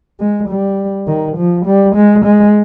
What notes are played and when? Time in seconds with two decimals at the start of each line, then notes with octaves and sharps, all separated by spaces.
0.20 G#3
0.49 G3
1.08 D#3
1.37 F3
1.66 G3
1.96 G#3
2.25 G#3